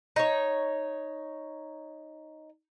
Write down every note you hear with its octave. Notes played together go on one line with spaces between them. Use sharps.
D#4 C#5